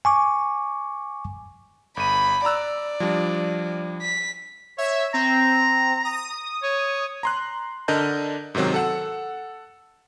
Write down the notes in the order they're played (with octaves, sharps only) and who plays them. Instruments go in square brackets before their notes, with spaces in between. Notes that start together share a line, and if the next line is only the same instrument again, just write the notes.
[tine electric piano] G#5 C#6 D6
[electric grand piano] G1 D#7 [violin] B5
[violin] D5 [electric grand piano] A#5 E6 F#6
[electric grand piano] F3 G3 D4
[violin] B6
[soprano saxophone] C#5 [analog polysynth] E5
[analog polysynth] C4 [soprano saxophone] A#5
[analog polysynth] D#6
[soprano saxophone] C#5
[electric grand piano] A#5 C6 F#6
D3 D4 A#4 D#5 A5 G6
G#2 C3 D#3 F#3 C4
A4 F#5 E6